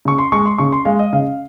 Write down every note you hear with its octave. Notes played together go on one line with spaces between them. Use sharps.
C#3 C#6
C6
G#3 C#6
C6
C#3 C#6
C6
G#3 F5
D#5
C#3 F5